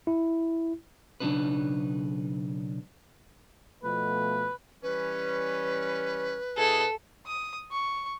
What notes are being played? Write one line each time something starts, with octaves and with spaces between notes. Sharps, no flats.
E4
B1 C#3 F#3 D4 D#4 B4
B2 F3 A3 B4
E3 G3 C#4 B4
B2 E4 G#4 A4
D#6
C#6